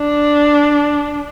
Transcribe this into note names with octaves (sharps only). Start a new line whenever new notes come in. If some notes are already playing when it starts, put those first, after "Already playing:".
Already playing: D4